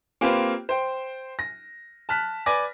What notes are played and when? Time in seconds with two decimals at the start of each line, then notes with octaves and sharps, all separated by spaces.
0.21 A#3 C4 F4 G4 B4 C5
0.69 C5 G5
1.39 A#6
2.09 A5 F6 F#6 B6
2.46 B4 D5 G#5 D6 A#6